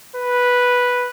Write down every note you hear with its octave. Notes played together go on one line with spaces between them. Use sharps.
B4